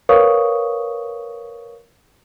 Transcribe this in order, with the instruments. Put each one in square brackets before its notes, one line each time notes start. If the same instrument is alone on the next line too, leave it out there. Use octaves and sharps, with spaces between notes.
[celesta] A#4 B4 C#5 F5 C#6 D#6